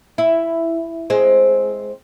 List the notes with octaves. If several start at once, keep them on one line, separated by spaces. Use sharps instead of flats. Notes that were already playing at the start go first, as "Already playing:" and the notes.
E4
G#3 C4